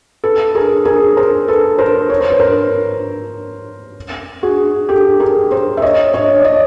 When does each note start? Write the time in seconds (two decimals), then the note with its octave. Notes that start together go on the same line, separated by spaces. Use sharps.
0.24 A4 B4
0.55 G#4 A#4
0.85 G#4 A#4
1.17 A#4 C5
1.48 A4 B4
1.78 A#4 C5
2.10 C#5
2.20 C5
2.30 B4
2.40 A#4 C5
4.43 F#4 G#4
4.89 G4 A4
5.20 G#4 A#4
5.51 A#4 C5
5.77 E5
5.82 C#5 D#5
6.14 C#5 D#5
6.40 D5
6.44 C#5 D#5